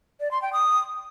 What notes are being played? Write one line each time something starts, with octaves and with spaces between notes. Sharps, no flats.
D5
C6
G5
D#6